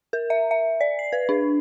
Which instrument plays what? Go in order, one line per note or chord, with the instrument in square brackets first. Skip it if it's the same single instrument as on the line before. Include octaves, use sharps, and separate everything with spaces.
[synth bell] A#4
E5
E5
D5
C7
B4
D4